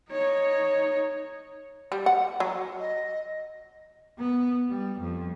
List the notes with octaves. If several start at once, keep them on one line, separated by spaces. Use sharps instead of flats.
D#4 C#5
G3
F#5
F#3
D#5
B3
G3
F2